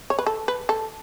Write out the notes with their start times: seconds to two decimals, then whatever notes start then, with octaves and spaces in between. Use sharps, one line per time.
0.10 C#5
0.19 B4
0.27 A4
0.48 B4
0.69 A4